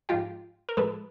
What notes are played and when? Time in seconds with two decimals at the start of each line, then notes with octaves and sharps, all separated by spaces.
0.09 G#2 F3 G#3 F4 G4
0.69 A#4
0.77 A2 F3 G#3 A4 B4